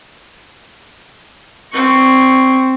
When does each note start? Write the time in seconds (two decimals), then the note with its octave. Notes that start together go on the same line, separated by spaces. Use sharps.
1.72 C4 C#6